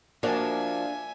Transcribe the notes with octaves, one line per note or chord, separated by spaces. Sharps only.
F3 A#3 D4 F#4 A#4 E5 G#5